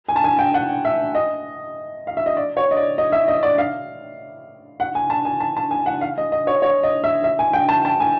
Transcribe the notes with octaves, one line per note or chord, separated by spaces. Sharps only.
G#5
A5
G#5
G5
F#5
E5
D#5
F5
E5
D#5
D5
C#5
D#5
D5
D#5
E5
D#5
D5
F5
F#5
G#5
A5
G#5
A5
A5
G#5
F#5
F5
D#5
D#5
C#5
C#5
D#5
E5
E5
G#5
G5
A5
A5
G#5